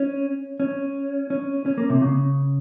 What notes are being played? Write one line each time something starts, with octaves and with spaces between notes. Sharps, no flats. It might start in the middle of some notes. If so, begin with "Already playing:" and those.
Already playing: C#4
C#4
C#4
C#4
A#3
C3
C#3